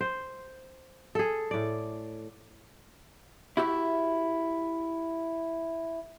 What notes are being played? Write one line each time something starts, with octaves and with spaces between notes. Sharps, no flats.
C5
G#4 A4
A2 D5
E4 F#4 G4 E5